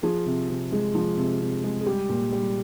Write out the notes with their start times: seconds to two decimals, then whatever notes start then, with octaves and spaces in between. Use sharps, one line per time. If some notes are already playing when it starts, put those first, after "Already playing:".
0.03 F3 G#4
0.26 C3
0.49 C3
0.72 G#3
0.95 F3
1.17 C3
1.41 C3
1.64 G#3
1.81 G#4
1.86 G3 G4
2.09 A#2
2.32 G3